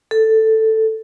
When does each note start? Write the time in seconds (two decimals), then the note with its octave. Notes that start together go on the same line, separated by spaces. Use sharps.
0.11 A4